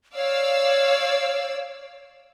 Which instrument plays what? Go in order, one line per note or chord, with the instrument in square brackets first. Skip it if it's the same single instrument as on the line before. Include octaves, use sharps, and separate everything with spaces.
[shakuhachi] C#5 [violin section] D5 F5 E6